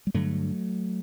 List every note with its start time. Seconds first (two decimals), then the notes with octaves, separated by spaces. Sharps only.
0.07 G3
0.14 G2 D3 F#3 A3